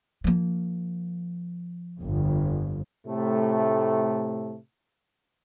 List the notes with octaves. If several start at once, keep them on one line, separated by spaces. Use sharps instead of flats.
F3 A#3
G1 F2
A2 C3 A3